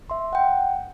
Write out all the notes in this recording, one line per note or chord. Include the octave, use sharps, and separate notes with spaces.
E5 C6
F#5 G5